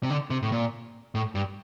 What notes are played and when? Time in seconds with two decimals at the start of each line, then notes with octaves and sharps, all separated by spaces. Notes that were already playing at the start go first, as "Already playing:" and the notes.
0.03 C3
0.10 D3
0.30 C3
0.43 A2
0.52 A#2
1.15 A2
1.35 G2